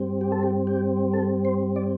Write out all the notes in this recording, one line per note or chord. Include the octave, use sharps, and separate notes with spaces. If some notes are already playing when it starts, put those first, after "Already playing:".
Already playing: G2 G3 C4
G4
A4
G4
G4
A4
C5
D5